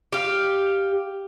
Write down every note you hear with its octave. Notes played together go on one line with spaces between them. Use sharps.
G4 F5